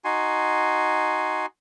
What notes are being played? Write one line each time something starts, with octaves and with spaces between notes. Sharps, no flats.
D#4 F#4 G#5 C6